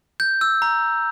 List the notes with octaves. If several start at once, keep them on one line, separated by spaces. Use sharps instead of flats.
G6
E6
A#5